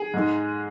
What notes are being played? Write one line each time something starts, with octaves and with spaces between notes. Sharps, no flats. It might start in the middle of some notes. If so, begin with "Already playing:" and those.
Already playing: G#4
G#2 G#3